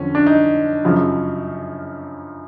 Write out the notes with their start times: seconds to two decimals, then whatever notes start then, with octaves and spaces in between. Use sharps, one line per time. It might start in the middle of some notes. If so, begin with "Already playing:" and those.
Already playing: F2 D3 F3 C#4
0.15 D4
0.27 D#4
0.85 F#2 C#3 F3